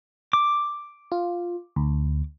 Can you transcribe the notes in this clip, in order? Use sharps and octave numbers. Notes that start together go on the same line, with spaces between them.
D6
F4
D2